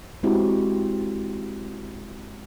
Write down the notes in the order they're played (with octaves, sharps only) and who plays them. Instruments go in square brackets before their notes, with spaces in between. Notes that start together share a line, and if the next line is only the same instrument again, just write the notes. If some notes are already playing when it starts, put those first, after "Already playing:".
[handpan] G#3 C4 E4 F#4 G4